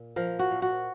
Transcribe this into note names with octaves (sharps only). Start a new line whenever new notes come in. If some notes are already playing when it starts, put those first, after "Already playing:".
Already playing: A#2
F3 A#4
F#4
A#2
F#4